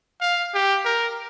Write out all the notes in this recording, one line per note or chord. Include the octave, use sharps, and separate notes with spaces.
F5
G4
A#4